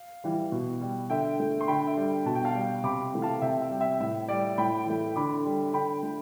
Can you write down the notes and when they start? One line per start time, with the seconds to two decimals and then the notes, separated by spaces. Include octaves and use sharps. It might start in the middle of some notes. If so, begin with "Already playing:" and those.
Already playing: F5
0.24 E3 G3
0.52 B2
0.81 G3
1.10 D3 E5 G5
1.40 A3
1.61 C6
1.68 D3 G5 B5
1.87 E5
1.97 G3
2.26 B2 A5
2.35 G5
2.45 F5 A5
2.55 G3
2.84 C3 B5 D6
3.14 E3 A3
3.22 F5 A5
3.42 C3 E5 G5
3.62 E5
3.71 G3
3.81 E5
4.00 A2 E5
4.28 G3 D5
4.58 A2 G5 B5
4.86 E3 A3
5.16 D3 B5 D6
5.46 G3
5.73 D3 G5 B5
6.03 A3